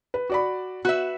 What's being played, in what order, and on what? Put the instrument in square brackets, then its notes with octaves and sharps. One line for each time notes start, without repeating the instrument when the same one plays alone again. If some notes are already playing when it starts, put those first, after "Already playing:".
[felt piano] B4
F#4 D5 B5
[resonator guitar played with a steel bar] F#4 B4 E5 [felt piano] F#6